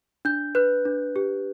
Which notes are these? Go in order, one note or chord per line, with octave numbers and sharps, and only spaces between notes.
D4 G6
B4 F#6
D4
G4